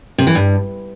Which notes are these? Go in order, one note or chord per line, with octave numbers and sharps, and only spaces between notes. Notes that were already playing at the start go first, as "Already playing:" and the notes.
C3
E3
G2